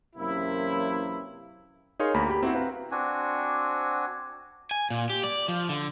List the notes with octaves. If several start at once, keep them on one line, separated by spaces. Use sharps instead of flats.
F#2 C3 E3 A#3 E4
D#4 G#4 A#4 C#5 F5 C6
D2 A#3 A#5 B5
G4 B5
C4 E4 F#4 C5 F#5
C4 B4 F5 A#5
C4 D4 F#4 G#5
G#5
A#2
G4
D5
F3
D3